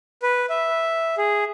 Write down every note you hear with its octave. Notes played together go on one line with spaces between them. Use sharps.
B4
E5
G#4